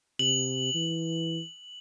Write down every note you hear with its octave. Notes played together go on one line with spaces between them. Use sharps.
C3 F#7
E3